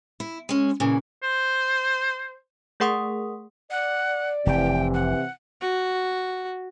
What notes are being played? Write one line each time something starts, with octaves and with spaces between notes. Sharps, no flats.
E4
G#3 C#4
A#2 C#3 E3
C5
A3 G#4 A#4 F#5 C6 D#6
D5 F#5
F1 C3 E3 G5
F#5
F#4